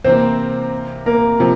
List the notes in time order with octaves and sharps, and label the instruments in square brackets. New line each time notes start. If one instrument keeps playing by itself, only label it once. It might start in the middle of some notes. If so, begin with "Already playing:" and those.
[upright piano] C3 E3 A#3 [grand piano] C4 C5
[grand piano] A#3 A#4
[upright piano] C3 F3